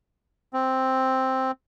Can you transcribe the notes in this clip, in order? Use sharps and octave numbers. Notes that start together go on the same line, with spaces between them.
C4